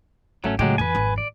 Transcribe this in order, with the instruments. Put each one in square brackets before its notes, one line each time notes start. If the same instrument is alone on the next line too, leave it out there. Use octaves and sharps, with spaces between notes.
[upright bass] G#1 [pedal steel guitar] F#3 A3 C#4
[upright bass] A2 C#3 [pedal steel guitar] F#3 G#3 G4
[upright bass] F2 E3 [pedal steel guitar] B4 G#5
[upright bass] G#1 F2
[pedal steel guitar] D5